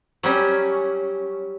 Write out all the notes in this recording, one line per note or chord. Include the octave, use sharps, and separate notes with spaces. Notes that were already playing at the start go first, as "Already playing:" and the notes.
F#3 G3 C#4